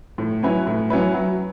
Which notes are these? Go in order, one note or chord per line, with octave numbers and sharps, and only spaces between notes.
A2
F#3 C#4 E4 B4
A2
F#3 C#4 E4 B4
F#3